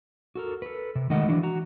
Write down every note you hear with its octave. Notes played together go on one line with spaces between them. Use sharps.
F#4 A4 A#4
A4 B4
C3
D#3 G#3 A3 D#5 F#5
E3 F#3 D4
F#4 A#5